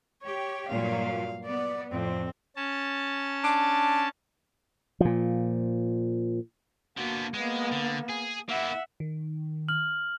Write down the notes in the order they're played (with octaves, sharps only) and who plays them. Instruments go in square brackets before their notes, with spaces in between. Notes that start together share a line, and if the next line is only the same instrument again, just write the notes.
[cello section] G4 [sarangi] C#5
[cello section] G2 A#2 F#3 [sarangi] F5
[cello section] B3 [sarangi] D5
[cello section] F2 A2 [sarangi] C4
[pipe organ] C#4 A5
[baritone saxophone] D4
[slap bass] A#2 F3
[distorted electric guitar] D3 B3 [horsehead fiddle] A#3 F#4
[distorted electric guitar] G#3 [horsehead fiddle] A#3 B3
[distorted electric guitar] D3
G#4
[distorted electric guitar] A#3 E4 [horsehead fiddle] E5 F#5
[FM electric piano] D#3
[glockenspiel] F6 F#7